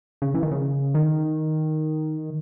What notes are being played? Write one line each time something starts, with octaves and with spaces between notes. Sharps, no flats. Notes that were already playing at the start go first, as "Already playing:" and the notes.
C#3
E3
D#3
C#3
D#3